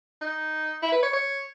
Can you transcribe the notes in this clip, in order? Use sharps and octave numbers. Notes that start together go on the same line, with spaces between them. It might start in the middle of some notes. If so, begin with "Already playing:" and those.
D#4
E4
B4
C#5
C#5